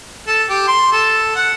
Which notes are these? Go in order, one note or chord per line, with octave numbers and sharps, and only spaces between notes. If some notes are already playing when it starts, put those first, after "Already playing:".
A4
G4
C6
A4
F#5